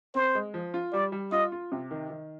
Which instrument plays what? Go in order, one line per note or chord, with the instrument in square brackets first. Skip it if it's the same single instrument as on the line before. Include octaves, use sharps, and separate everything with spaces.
[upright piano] C4 [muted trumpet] C5
[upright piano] G#3
F3
F4
[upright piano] G3 [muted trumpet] D5
[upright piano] G3
[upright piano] F4 [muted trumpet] D#5
[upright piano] F4
C3
D#3
D#3